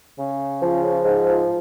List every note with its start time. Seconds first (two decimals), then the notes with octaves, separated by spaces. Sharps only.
0.19 C#3
0.62 F3
1.05 G#2